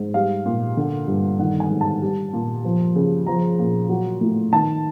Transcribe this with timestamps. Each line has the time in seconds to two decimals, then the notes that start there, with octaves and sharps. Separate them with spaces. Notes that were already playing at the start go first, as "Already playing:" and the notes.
Already playing: G#2
0.14 G3 F5
0.46 A#2
0.77 D3
1.08 G2
1.39 D#3 F#5
1.60 G#5
1.71 G#2
1.81 A5
2.02 G3
2.33 A#2
2.64 F3
2.96 C#3
3.27 F3 A#5
3.59 A#2
3.89 F#3
4.21 A2
4.53 D#3 A5